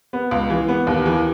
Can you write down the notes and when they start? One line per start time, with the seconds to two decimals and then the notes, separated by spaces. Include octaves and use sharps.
0.13 B3
0.31 C#2
0.50 E3
0.68 B3
0.87 D#2
1.06 E3